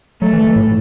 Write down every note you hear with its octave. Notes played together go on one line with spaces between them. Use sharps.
F#3 A3
E3
E3
A2